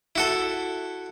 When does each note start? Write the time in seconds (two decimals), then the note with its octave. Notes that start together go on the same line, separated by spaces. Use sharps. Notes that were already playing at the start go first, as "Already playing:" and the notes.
0.16 E4 F#4 A4